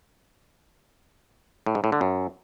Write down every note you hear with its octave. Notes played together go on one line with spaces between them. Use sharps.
A2
G#2
A2
D3
F#2